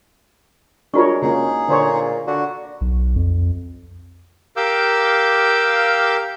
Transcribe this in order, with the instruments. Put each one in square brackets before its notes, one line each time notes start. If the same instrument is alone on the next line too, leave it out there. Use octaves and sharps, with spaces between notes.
[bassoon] G#3 [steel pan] D4 A#4 C#5 [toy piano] F4 F#4 C#6
[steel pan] C#3 A#3 C#4 [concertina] D#4 G#4
[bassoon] A#2 [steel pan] D3 C5 C#5
[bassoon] D3 [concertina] F#4
[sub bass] B1
F2
[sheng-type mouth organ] G4 A#4 F5 D6 E6 G6